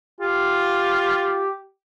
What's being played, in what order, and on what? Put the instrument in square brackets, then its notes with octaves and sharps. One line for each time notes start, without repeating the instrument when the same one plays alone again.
[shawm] F4 [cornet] G4